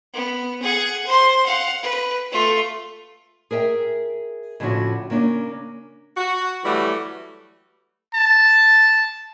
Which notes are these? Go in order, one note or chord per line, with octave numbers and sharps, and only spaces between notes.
B3
G#4 F#5
C5 C6
F5 F#5
B4
A3 F4
G#4 A#4 E5 G5
A2 C#3 F3 A3 D4 F#4
C#3 A#3 C#4 D4
F#4
E3 F#3 G3 A3 F#4
A5